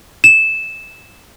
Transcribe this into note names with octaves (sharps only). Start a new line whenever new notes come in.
E7